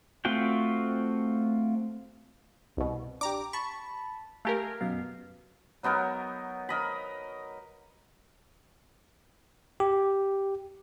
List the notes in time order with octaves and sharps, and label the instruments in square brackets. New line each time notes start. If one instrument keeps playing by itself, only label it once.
[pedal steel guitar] A3 C4 F4 F#4 G5
[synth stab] C2 B2
[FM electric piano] D4 G4 [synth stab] A#5 D6
[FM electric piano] A5 B5 [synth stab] C#6
[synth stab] A3 G4 A#4 [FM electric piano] F5 G#5 A#5
[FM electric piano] F#2 B2 F5
[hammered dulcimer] F#3 B3 D#4 A#4
A#4 D#5 B5
[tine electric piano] G4